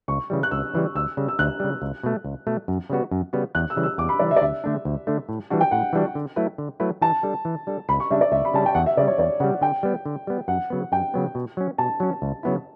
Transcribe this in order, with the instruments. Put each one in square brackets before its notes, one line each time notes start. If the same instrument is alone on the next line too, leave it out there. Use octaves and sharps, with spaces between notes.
[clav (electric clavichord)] C#2 [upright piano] C#6
[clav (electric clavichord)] C#3 E3 G3
[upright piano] F#6
[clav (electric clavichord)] C#2 [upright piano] E6
[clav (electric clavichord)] C#3 E3 G3
[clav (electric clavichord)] D2 [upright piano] E6
[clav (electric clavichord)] C#3 G3
[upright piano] E6
[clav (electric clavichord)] D2 [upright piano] F#6
[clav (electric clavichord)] C#3 G3
C#2
B2 A3
C#2
B2 A3
F#2
C#3 G3 B3 F#4
F#2
C#3 G3 B3 F#4
[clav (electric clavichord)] E2 [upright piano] F#6
[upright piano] E6
[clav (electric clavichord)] C#3 E3 G3
[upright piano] E6
[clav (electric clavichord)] E2 [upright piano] D6
[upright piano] B5
[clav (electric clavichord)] C#3 E3 G3 [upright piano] D5
[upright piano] E5
D5
[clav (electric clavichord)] D2 [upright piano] E5
[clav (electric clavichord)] D3 A3 D4
D2
D3 A3 D4
A2
E3 G3 D4 F#4
[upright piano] G5
[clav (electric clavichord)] A2 [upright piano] F#5
[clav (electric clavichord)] E3 G3 D4 F#4
D3
F#3 A3 E4 B4
D3
F#3 A3 E4 B4
[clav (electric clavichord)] E3 [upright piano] A5
[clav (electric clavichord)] G3 D4 A4
E3
G3 D4 A4
[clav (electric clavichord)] C#2 [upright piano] B5
[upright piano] C#6
[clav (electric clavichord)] C#3 G3 D4 [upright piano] E5
[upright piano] D5
[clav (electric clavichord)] C#2 [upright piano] E5
[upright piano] B5
[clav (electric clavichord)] C#3 G3 D4 [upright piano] A5
[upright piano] G5
[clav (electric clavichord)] E2 [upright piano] F#5
[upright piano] E5
[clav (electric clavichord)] C#3 [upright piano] D5
[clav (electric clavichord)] G3
[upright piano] C#5
[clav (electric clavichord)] E2 [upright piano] D5
[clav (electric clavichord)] C#3 [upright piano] F#5
[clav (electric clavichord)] G3
[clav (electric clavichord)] D3 [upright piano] G5
[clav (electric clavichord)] G3 B3
D3
G3 B3
[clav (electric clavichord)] F#2 [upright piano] F#5
[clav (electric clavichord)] C#3 F#3 B3
[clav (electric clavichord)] F#2 [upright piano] G5
[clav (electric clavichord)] C#3 F#3 B3
B2
F#3 C#4
[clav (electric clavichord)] B2 [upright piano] A5
[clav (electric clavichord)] F#3 C#4
C#2
C#3 F#3 B3 E4